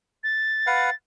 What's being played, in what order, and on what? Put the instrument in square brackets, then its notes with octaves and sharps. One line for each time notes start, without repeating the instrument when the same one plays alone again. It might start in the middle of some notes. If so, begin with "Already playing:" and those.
[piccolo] A6
[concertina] B4 F5 F#5